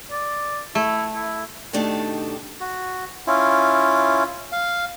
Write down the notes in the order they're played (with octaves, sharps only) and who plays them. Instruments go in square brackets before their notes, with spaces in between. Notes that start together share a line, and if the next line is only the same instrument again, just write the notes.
[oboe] D5
[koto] A3 [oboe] E4
[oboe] E4
[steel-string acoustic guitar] B2 D#3 A3 D4 D#4 G4
[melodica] F#4
C#4 E4 F4
F5